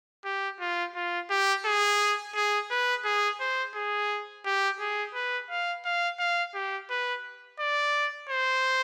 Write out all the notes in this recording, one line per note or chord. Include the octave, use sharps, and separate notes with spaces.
G4
F4
F4
G4
G#4
G#4
B4
G#4
C5
G#4
G4
G#4
B4
F5
F5
F5
G4
B4
D5
C5